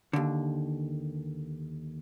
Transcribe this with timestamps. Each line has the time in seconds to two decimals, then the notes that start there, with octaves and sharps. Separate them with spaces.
0.13 D#2 D3